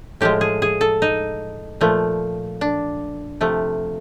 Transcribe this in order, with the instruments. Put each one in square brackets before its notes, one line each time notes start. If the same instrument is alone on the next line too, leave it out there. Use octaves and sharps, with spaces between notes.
[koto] A2 F3 G#3 G4
G#4
G#4
A4
D#4
A#2 F3 A3
D4
C3 F3 A3